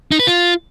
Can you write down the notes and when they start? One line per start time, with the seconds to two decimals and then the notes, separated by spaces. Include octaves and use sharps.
0.12 D#4
0.19 B4
0.27 F4